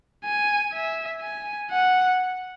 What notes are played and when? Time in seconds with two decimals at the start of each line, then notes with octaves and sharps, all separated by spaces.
0.25 G#5
0.73 E5
1.22 G#5
1.70 F#5